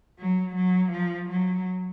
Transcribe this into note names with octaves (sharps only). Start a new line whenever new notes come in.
F#3
F#3
F3
F#3